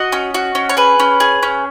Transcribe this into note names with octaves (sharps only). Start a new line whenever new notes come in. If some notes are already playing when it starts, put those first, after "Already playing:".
Already playing: F#4 D#5
C#4
F#4
C#4
C#5
G#4 B4
C#4
G#4
C#4